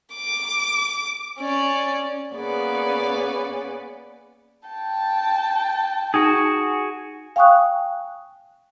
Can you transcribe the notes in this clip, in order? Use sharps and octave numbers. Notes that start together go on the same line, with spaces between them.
D6
C#4 D5
A#3 B3 C#4 G#4 B4 D5
G5 A5
D#4 F#4 G#4
F5 G5 G#5 C#6 D#6 F#6